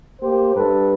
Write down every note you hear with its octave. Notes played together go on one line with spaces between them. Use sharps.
A#3 G4 C5
G2 A4 B4